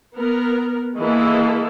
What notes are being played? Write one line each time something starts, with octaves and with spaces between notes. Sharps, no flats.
B3 A#4
E3 G#3 A#3 E4 A4